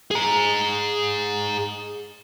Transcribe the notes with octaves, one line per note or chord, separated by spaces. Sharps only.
G#4 A#5